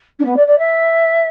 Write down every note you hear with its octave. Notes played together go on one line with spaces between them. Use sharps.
D4
B3
D5
D5
E5